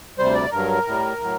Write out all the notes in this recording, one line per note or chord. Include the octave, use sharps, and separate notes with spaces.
D2 C3 G3 C5
D5
G2 F#3 A#4
A2 G3
A2 F#3